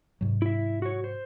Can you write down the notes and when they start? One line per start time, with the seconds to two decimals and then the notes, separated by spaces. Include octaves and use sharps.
0.21 G#2 C3 F#3
0.42 E4 E5
0.82 F#4 C#5
1.04 C5